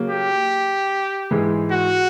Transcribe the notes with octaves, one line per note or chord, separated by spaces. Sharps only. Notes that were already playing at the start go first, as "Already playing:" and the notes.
Already playing: C#3 F#3 A#3
G4
G#2 E3 G#3
F#4